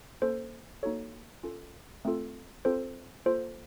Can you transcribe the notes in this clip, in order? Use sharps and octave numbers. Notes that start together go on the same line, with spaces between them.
A#3 C#4 A4 C5
A#3 D#4 F#4 A4 C#5
C#4 F4 A4
A3 C4 F4 A4
C4 F4 A4 C5
A#3 F4 A4 C5